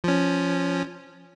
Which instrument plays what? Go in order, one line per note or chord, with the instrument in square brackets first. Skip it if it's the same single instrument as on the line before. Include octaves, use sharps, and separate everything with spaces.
[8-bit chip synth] F3 C#4